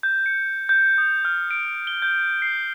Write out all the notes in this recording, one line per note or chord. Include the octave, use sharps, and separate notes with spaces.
G6
C#7
G6
D#6
F6
D7
G7
G6
C7